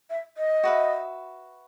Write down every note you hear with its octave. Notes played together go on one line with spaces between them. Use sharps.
E5
D#5
F#4 B4 E5